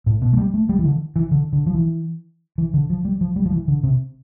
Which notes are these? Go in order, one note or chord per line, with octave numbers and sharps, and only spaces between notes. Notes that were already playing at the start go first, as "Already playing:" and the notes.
A2
B2
A3
G3
A3
G3
E3
D3
E3
D3
D3
F3
E3
E3
D3
F3
G3
F3
G3
F3
E3
D3
C3